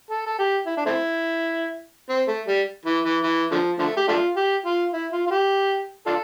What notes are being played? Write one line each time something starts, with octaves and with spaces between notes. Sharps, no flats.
A4
A4
G4
E4
D4
A3 C4 E4
C4
A3
G3
E3
E3
E3
D3 F3
D3 F3 A3
G4
A3 D4 F4
G4
F4
E4
F4
F4
G4
D4 F4 A4